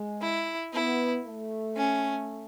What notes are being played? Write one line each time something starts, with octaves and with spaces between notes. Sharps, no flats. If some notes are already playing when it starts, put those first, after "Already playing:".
Already playing: G#3
E4
B3 E4
A3
C#4